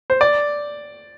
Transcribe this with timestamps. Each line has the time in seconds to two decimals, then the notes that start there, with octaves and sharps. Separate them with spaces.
0.10 C5
0.21 D5